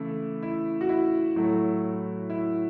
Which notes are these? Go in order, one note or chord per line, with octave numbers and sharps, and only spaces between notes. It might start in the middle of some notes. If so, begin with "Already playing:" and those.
Already playing: C#3 E3 A3 E4
E4
F#4
E4
A2 F#3 A3
E4